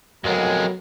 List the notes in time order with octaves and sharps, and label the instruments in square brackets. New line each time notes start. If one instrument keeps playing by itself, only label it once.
[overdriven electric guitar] F2 G#3 [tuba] F#3 [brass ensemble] A3 B3 A#4